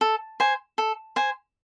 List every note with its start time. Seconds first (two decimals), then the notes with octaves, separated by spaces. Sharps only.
0.01 A4
0.40 C5 G#5
0.78 A4
1.16 C5 G#5